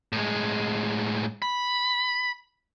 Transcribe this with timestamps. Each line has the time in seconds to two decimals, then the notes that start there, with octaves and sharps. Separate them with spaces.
0.12 A2 G#3
1.42 B5